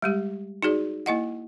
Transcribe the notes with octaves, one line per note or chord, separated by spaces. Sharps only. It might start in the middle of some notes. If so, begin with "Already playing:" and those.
G3 G#3 G4
D#4 F#4 G#4 D5
A#3 E4 D#5 F#5